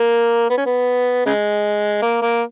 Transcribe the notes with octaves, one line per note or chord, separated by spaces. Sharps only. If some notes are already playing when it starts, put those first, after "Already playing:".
Already playing: A#3
B3
C#4
B3
C#3 G#3
A#3
A#3